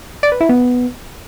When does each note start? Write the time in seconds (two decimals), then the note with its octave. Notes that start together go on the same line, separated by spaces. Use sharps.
0.23 D5
0.32 B4
0.41 E4
0.49 B3